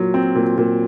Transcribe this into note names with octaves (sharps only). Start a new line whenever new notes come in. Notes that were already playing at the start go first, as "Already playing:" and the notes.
Already playing: A#2 F#3
C4
A#2
A#2